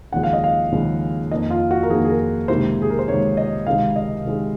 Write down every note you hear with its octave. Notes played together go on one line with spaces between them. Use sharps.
D#2 C#3 F3 G#3 F#5
F5
D#5
F5
D#2 C#3 F3 G#3
F2 D#3 A#3 D#5
F4
F#4
A#4
F2 D#3 A#3 G#4
G#4
A#4
C#2 C3 D#3 A#3 C5
G#4
A#4
C5
C#2 C3 D#3 A#3 C#5
D#5
C#2 C3 D#3 G#3 F5
D#5
C#2 C3 D#3 G#3